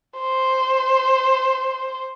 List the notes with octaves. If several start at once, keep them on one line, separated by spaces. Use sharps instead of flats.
C5